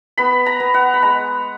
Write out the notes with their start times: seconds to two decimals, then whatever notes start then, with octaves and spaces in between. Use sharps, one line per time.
0.18 B3 B5
0.46 A#5
0.60 B3
0.74 F#5
0.94 B5
1.02 G#3 A#5